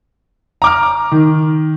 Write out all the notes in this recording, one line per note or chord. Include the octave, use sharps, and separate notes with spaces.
A#5 D6 F6
D#3